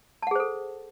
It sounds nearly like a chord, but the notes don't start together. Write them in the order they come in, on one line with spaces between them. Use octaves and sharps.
A5 F#5 G#4 C5 A4